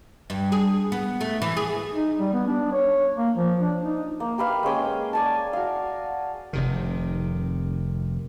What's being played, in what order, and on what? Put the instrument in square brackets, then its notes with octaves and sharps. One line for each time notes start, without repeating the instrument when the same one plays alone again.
[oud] G2
G#4
B3
A3
E3
G#4
[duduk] D#4
G3
B3
D4
C#5
A#3
F3
D4
D#4
[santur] A#3
G4 B4 F5
G#3 A#3 C#4 G5
D5 G#5 A5
F#4 F5
[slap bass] F1 C3 D#3